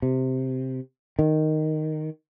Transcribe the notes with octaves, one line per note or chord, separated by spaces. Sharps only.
C3
D#3